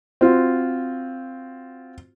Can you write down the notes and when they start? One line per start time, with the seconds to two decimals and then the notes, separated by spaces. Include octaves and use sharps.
0.21 C4 F4 F#4